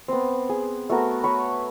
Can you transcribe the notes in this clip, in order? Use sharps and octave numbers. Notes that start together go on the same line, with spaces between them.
B3 C4
G#4
A3 B3 F#4 A#4
B4 C#5 B5